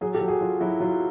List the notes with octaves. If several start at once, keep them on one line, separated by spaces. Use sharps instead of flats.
F#3 F#4 G#4
G4 A4
F#3
F#4 G#4
F#3 F4
F#3 E4 F#4
F#3 F4